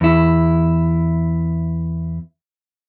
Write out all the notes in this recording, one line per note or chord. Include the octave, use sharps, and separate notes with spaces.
E2 E4